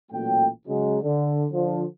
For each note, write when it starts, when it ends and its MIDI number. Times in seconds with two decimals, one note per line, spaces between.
0.12 0.47 33
0.12 0.47 46
0.12 0.47 54
0.12 0.47 57
0.12 0.47 79
0.68 0.97 49
0.68 0.97 54
0.68 0.97 56
1.02 1.45 50
1.52 1.84 50
1.52 1.84 53